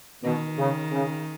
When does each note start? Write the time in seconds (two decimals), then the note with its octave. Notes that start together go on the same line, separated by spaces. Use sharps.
0.23 B2 D#3
0.58 C#3
0.91 C#3